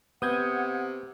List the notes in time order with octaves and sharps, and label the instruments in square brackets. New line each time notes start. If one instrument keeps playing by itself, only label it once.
[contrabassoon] C3 [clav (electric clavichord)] B3 [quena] F#5 [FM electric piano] D#6 G6 G#6